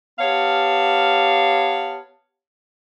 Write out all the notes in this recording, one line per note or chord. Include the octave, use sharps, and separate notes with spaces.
B3 G4 C#5 F5 A5